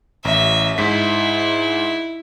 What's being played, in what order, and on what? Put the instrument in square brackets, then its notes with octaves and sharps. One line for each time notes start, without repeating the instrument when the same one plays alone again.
[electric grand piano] A1 [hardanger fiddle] E5
[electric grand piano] G#2 B6 [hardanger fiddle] E4